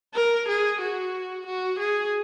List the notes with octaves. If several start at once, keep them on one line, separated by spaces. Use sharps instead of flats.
A#4
G#4
F#4
F#4
G#4